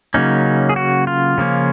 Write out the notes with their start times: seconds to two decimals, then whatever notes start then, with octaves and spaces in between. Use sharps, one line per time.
0.14 C#3 F#3 A#3 C#4 D#4
0.69 G#4
0.76 F#4
1.07 F4
1.38 C#3 F3 A#3 C#4